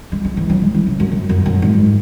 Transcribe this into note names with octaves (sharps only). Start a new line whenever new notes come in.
G#3
G#3
E3
F#3
G#3
E3
C#3
F#2
F#2
F#2
F#2
G#2